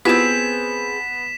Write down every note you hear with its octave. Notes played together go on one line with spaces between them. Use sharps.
B3 C4 E4 F4 G4 G#4 B6 E7